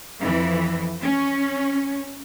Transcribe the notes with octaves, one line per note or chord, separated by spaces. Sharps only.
F2 E3
C#4